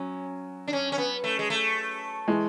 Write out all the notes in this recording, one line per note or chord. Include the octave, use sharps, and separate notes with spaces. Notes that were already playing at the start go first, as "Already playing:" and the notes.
Already playing: F#3 C#4
D4
C#4
C#4
B3
A3
G#3
A3
E3 G#3